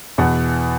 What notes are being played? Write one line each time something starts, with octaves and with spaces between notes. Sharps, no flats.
E2 B2 F#5